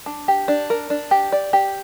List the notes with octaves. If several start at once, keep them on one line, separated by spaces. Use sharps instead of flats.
D4
G4
D4
A#4
D4
G4
D5
G4